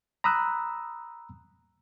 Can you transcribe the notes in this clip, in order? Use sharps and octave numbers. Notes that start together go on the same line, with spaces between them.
A#5 B5 D#6 E6 F#6